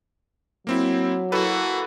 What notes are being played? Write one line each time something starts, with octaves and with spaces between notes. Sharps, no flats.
F#3 A#3 C4 E4
A#3 E4 F#4 A4 B4